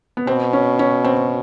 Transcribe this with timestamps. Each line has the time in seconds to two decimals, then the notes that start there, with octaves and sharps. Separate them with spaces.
0.17 B3
0.27 B2 C4
0.53 C#4
0.79 C#4
1.04 C4